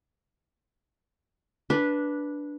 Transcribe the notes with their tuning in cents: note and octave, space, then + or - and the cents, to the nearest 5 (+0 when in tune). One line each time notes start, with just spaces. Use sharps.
D4 -5 B4 -10